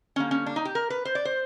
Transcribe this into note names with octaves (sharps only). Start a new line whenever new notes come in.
D3 G3 A#3 C#4
C#4
D4
D#4
G4
A#4
B4
C5
D5
C5